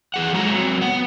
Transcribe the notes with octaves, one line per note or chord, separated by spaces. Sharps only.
E2 G#4 F#5
F2 F#3 G#3 F#4 A5 A#5
F#3 C4
B3 F#5